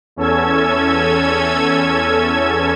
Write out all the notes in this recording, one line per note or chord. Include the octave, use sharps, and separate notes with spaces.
E2 C#4 A4 E6 G#6